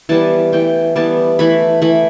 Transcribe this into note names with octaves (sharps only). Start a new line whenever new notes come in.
E3 G3 B3 A5
E3 A3 G5
E3 G3 B3 A5
E3 A3 B5
E3 A3 B5